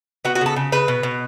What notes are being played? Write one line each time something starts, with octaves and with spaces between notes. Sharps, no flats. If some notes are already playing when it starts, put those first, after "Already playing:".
B3 F#4
F#4
C#3 A4
C#3
C#3 B4
B2
B2